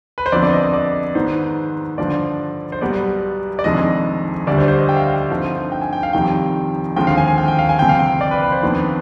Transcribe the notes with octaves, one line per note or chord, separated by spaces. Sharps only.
B4
C5
F2 D3 F3 B3 D5
D5
D#5
D#5
D5
G#2 D#3 B3 C5
G2 D3 F3 D5
C5
B1 B2 G3 B3 D5
D5
F1 F2 D#3 G#3 D4 D#5
D2 D3 G3 D4 D5
C5
C5
D#5
G5
F5
G5
G2 D3 F3 C4 D#4
G5
G#5
G5
F5
F1 F2 D#3 G3 G5
D#2 D3 F3 G#3 C4 G5
F5
G#5
G#5
G5
G5
F5
G#5
G1 F2 C3 G5
F5
G5
D5
B4
B4
C5
F2 D#3 B3 D4